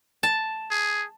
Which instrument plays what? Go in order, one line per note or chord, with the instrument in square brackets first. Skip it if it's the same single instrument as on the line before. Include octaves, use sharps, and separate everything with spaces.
[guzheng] A5
[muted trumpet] G#4